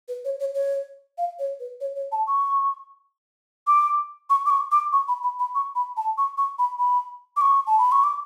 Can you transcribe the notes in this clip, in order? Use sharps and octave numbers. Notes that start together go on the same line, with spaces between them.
B4
C#5
C#5
C#5
F5
C#5
B4
C#5
C#5
A5
C#6
D6
C#6
D6
C#6
D6
C#6
B5
B5
B5
C#6
B5
A5
C#6
C#6
B5
B5
D6
C#6
A5
B5
C#6
D6